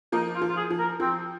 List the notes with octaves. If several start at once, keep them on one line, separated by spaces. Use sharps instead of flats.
F3 A#3 D#4
F4
F3
F4
G#4
F3
A#4
F3 C4